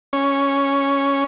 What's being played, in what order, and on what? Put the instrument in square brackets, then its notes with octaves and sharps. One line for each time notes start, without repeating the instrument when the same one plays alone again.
[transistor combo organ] C#4